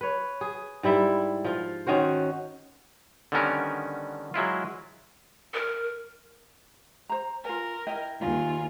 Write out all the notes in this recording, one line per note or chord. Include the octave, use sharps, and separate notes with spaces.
B4 C#5
G#4
G#2 G3 E4 E5
F3 F4
D#3 C#4 F#4 C5
D3 D#3 G3 B3 C#4 A#4
F#3 G#3 E4 F4
A#4
C5 A#5
F4 A#4 G#5
E4 D#5 G5
D#2 F4 G#4